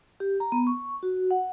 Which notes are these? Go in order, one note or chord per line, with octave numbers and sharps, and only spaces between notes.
G4
A#5
B3
C#6
F#4
F#5